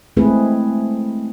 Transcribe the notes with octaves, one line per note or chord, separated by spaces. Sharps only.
G#3 A3 C4 E4 G#4 B4